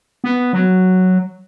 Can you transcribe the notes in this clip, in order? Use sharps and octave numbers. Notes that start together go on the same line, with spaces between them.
B3
F#3